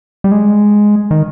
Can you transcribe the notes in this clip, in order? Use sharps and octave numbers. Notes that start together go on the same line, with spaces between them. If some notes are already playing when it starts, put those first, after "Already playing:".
G3
G#3
D#3